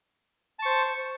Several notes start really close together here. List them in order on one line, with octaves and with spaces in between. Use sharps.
A5 C#6 C5